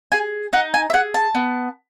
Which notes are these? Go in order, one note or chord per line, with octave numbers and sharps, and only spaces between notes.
G#4 G#5
D#4 F#5
G#5
E5
G#4 F#5
A5
B3